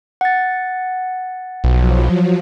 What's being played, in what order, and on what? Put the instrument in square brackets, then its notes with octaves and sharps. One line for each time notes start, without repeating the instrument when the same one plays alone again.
[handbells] F#5 A6
[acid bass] B1 [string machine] F3 F#3